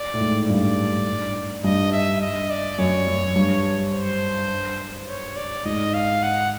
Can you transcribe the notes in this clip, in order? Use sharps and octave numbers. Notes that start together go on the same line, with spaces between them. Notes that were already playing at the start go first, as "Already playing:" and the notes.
Already playing: D5
A2
G#2
G2 D5
G2 D#5
E5
D#5
D5
F#2 C#5
F#2
G2
C5
C#5
D5
G#2 D#5
F5
F#5